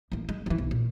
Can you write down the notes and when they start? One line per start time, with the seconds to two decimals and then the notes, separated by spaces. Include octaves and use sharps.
0.12 A1 A#3
0.29 G#3
0.46 D#3 E3
0.58 B1
0.71 A#2